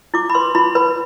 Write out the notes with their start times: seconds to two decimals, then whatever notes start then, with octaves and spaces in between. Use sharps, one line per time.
0.14 E4 D6
0.30 B5
0.34 B4 C6
0.55 E4 B5
0.75 B4 B5